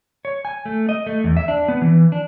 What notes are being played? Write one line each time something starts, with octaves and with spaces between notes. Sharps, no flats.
C#5
G#5
A3
D#5
A3
E2
E5
D4
B3
E3
D4